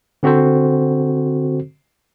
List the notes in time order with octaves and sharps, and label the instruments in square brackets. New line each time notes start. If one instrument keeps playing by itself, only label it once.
[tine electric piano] D3 C4 F#4 A4 C5